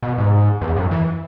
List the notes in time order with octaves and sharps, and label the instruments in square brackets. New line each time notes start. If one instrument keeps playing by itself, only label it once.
[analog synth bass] B2
G#2
E2
F#2
E3